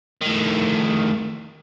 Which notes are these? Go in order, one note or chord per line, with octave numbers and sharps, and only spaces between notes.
A2 D#3